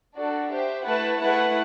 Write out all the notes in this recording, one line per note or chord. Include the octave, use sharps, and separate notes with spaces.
D4 F#4 A4 D5
G4 C5 E5
A3 E4 B4 F#5 A5
A3 E4 B4 F#5